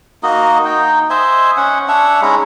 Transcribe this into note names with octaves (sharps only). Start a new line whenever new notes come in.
A#3 D#4 F#4 D#5
D#4 G5
C5 D#5 E5 G#5
C#4 F#5
D4 C#5 E5 F#5
G#3 C#4 D#4 E4